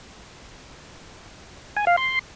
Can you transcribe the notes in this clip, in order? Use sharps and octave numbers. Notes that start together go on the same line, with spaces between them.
G#5
F5
C6